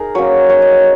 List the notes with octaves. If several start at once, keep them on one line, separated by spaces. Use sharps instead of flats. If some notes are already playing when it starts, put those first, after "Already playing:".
Already playing: D#4 G#4 A#4
F#3 A#3 C#4 C#5
A#3 D#4 C#5
D#5